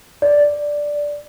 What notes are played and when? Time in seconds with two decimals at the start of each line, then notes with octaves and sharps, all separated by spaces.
0.22 D5